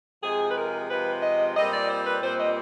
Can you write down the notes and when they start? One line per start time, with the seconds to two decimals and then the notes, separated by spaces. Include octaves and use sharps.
0.23 C3 F3 G#3 G#4
0.50 B4
0.57 A#4
0.90 C3 F3 G#3 B4
1.22 D#5
1.56 A#2 G3 C4 D#5
1.73 D5
1.89 C5
2.05 B4
2.22 A#2 G3 C4 C5
2.39 D#5